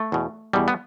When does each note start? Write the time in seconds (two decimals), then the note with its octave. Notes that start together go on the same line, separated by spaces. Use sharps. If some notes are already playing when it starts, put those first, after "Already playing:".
Already playing: A3
0.12 E2 B2
0.53 E2 B2 G3
0.68 B3